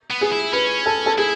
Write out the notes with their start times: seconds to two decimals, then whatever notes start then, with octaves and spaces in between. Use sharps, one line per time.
0.10 B3
0.21 G#4
0.31 E4
0.53 C#4 B4
0.86 A4
1.06 A4
1.18 E4 G#4